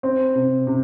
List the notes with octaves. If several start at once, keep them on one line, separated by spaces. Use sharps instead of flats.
C4
C3
C3